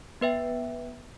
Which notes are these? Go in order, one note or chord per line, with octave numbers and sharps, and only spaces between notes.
B3 B4 E5 G5